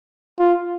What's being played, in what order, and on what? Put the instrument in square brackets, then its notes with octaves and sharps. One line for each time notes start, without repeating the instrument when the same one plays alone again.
[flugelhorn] F4